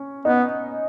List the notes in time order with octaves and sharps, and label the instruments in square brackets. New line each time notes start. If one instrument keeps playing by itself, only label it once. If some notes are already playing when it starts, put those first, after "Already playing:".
Already playing: [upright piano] C#4
[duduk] B3 [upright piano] D#4